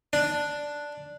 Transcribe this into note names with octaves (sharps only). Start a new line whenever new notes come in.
D4